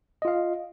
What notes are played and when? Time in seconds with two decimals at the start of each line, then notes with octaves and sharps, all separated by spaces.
0.22 D#5
0.25 F4
0.28 F5